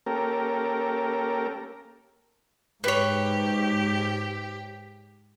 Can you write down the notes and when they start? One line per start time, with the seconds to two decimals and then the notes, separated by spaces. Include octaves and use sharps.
0.06 A#3 C#4 G4 A4 A#4
2.84 G#2 G4 B4 C#5